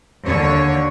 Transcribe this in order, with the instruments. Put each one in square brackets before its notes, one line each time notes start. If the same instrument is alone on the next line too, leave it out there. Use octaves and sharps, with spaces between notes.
[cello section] D#2 D3 C#5